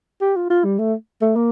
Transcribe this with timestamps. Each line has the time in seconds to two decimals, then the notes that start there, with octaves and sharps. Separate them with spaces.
0.21 G4
0.36 F4
0.50 F4
0.64 G3
0.79 A3
1.22 A3
1.36 A#3